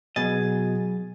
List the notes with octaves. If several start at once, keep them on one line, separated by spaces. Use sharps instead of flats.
B2 F#3 G#4 D#5 G#5 A6